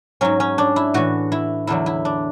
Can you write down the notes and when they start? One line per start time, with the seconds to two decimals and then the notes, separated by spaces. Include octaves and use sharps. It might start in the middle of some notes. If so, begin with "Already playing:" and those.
0.21 G#2 F#3 C#4
0.40 C#4
0.58 D4
0.76 E4
0.94 A2 E3 F#4
1.32 E4
1.67 E2 D3 F#3 E4
1.86 E4
2.05 D4